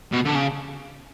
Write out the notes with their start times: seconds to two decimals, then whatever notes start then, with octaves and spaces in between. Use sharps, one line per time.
0.12 B2
0.25 D3
0.35 C#3